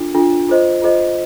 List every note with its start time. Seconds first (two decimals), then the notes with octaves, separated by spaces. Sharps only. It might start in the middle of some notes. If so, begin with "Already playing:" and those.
Already playing: D4 F4 A4
0.14 D4 F4 A4
0.48 F4 A4 C5 D#5
0.82 F4 A4 C5 D#5